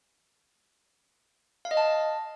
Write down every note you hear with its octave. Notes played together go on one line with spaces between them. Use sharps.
F5
D#5
A5